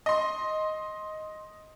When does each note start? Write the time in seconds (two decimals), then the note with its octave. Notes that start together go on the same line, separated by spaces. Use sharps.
0.06 D#5 C6